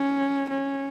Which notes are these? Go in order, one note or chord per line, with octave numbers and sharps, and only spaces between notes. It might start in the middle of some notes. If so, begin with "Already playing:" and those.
Already playing: C#4
C#4